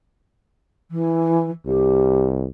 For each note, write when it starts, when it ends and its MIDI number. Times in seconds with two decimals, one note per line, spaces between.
0.91 1.50 52
1.66 2.47 36
1.66 2.27 67